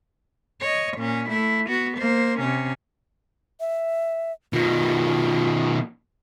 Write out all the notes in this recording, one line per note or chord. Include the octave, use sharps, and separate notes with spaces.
C#5 D#5
A#2 C#4
A3 E4
B3 F#4
A#3 C5
C3 C#4
E5
B2 D#3 F4